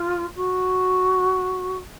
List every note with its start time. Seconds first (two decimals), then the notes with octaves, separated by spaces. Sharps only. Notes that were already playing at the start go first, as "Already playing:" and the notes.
Already playing: F4
0.36 F#4